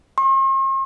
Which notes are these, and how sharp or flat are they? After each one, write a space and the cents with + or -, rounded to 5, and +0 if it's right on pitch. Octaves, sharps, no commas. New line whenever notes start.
C6 +45